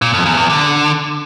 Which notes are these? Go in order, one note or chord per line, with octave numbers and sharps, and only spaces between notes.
A#2
F2
E2
E2
D3